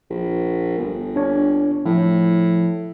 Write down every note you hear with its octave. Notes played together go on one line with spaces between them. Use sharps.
A#1
G1
D4 C#5
A2 F3